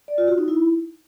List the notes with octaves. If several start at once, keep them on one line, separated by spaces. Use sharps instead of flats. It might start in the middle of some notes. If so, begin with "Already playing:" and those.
D5
F4
F#4
D#4
E4